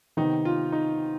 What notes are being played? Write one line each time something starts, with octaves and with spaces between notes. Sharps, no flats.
C3 D#3 B3 D#4
F4
D#4